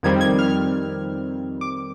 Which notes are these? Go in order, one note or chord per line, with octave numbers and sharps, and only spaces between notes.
F2 D#3 G3 C4 G#6
G#6
F6
D6